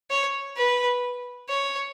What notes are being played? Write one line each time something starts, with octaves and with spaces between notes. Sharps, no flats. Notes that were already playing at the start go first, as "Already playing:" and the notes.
C#5
B4
C#5